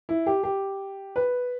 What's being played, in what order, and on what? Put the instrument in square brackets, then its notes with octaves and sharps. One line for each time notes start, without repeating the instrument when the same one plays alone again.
[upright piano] E4
G4
G4
B4